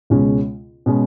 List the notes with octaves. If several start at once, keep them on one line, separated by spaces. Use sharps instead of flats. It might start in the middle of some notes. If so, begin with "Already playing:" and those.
C#2 B2 G#3 C#4
B2 G#3 C#4